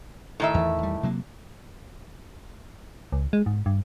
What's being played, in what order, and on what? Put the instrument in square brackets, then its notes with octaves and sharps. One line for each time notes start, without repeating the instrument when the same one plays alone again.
[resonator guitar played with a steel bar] A2 D#3 E5
[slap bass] E2 E3
E2 G3
C3 F#3 A#3
[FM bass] C#2
G#3
G#2
G2